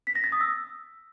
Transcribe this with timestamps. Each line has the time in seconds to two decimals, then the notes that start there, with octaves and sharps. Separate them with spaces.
0.07 B6
0.15 A#6
0.24 A6
0.32 D#6
0.41 E6